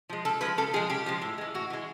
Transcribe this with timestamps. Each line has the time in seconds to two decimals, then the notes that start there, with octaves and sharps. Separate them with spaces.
0.09 F3 G#3
0.25 C#3 A4
0.41 F3 G#3 B4
0.58 C#3 A4
0.74 F3 G#3 G#4
0.90 C#3 G4
1.06 F3 G#3
1.22 A2
1.38 E3 G#3
1.54 A2 F#4
1.70 E3 G#3